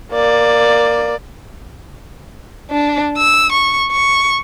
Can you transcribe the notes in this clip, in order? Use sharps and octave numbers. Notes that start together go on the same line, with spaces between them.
A#3 D5
D4
E6
C#6
C#6